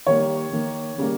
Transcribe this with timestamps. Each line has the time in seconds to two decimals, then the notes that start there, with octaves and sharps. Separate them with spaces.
0.07 D#3 G3 A#3 C#5
0.53 D#3 A#3
0.98 C#3 G3 A#3